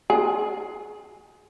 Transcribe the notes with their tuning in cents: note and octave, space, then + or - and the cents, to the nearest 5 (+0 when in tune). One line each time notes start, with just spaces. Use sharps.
G#4 +15